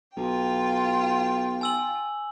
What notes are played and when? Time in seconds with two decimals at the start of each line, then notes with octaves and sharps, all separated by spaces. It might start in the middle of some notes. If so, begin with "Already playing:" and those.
0.17 B1 F4 G5
1.61 G#5 E6 F#7